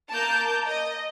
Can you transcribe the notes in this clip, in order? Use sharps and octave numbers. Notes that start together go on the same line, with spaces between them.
A#3 A5 A#5 D6 G6
D#5